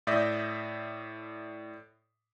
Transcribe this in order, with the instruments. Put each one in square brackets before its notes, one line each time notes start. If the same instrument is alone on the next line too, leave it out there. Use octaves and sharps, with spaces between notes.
[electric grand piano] A2 D5 E5 D#6 G6 A#6